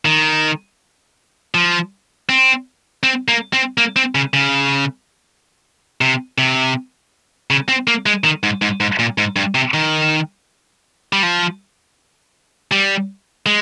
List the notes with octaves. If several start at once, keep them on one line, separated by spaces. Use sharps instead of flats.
D#3
F3
C4
C4
A#3
C4
A#3
C4
C#3
C#3
C3
C3
C#3
C4
A#3
G#3
D#3
G#2
G#2
G#2
A#2
G#2
G2
C3
D#3
G3
F3
G3
G#3